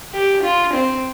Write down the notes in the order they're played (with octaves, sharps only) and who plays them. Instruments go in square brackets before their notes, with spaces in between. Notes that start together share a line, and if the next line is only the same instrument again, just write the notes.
[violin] G4
F4
C4